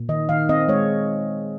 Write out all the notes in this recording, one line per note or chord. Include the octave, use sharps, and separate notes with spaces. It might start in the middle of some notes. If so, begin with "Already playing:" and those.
Already playing: A#2
D#3 D#5
D#3 F5
C4 D#5
G#3 C#5